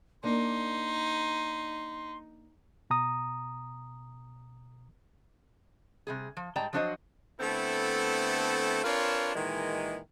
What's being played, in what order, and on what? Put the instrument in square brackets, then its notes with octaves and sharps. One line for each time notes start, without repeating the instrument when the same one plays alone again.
[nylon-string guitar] A#3 D4 A#4 [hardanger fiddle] D#4 [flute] C6
[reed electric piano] B2 A#5 D#6
[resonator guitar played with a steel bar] C3 G3 G#4
F3
G#2 G3 D5 G5 A5 A#5
F3 F#3 D4 F#4 C5 D#5
[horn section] D3 A3 B3 C4 E4 A4
C4 D4 F4 A#4 B4 C#5
A#2 D#3 E3 G#3